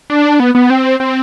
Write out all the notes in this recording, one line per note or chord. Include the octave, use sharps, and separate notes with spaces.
D4
B3
B3
C4
C4